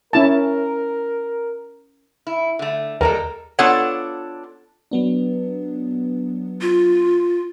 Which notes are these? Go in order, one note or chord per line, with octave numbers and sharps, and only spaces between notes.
C#4 E4 A#4 A5
E4
D3 A3
D#2 G3 G#3 A4 A#4
B3 D4 F4 A4 C#5 F#5
F#3 B3 D4
F4